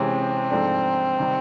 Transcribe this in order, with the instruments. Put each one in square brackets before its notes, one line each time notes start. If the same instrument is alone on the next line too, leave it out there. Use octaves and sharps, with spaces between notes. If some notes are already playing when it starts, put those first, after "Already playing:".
Already playing: [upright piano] C3 E3 G#3 C#4 [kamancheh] C4
[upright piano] G#2 F3 A3 D4
C3 D#3 G3